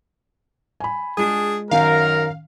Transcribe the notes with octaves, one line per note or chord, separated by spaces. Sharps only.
G#5 B5
G#3 D4 F4 G#4
F#2 D#3 C#4 A#4 F5